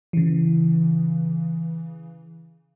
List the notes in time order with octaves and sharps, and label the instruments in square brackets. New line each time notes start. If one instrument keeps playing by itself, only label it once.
[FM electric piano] C#3 E3